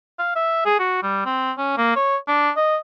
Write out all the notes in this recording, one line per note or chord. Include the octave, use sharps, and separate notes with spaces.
F5
E5
G#4
F#4
G3
C4
C#4
A#3
C#5
D4
D#5